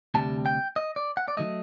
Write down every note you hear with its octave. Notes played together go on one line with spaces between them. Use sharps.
D2 C3 G3 A5
G5
D#5
D5
F#5
D5
D#3 F#3 A3 D#5